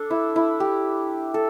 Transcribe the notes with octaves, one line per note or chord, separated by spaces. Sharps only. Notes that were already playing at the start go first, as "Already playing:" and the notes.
Already playing: D4 A4
E4
E4
G4
A4